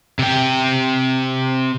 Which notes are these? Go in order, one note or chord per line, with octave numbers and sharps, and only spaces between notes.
C3 G5